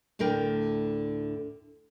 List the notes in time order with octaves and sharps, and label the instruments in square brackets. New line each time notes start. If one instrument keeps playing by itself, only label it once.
[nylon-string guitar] D2 A2 D3 A#4 G5